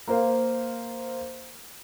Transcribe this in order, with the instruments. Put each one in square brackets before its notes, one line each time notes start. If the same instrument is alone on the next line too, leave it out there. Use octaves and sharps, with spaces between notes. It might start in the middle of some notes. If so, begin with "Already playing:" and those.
[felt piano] A#3 A#4 C5 F5